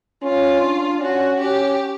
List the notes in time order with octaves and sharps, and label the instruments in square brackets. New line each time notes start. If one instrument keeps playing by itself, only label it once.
[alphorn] C#4 [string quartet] F4
[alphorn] D4
[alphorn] C#4 [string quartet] F#4
[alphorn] C#4 [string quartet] G4